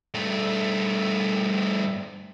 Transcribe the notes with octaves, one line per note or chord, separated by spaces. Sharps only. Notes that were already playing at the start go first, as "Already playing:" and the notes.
G2 A3